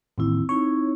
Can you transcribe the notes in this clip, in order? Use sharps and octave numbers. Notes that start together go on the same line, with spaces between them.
A1 D#2 C4 E4
C4 D#4 E4 C#5